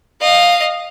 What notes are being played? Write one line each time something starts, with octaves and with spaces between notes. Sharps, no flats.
D#5 F5